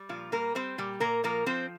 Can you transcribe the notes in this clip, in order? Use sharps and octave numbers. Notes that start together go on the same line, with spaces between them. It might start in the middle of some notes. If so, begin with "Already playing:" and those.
Already playing: G3
A#2 F3 F4
G3 A#3 A#4
G3 C4 C5
A#2 G3 G4
A#2 A#3 A#4
F3 A#3 A#4
F3 C4 C5